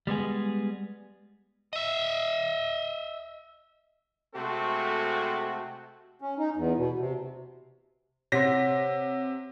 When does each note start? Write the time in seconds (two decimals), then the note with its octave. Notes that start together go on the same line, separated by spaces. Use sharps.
0.07 G3 G#3 B3 G#4
1.73 D#5 E5
4.35 C3 G#3 A3 C4 F#4 A4
6.22 C#4
6.39 D#4
6.56 E2
6.77 B2
6.98 C3
8.32 C3 C#5 F#5 C6 A#6 B6